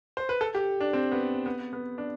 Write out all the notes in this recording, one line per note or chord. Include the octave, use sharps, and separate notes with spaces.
C5
B4
A4
G4
D4
C4
B3
B3
B3
D4